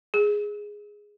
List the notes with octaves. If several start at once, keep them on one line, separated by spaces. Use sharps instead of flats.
G#4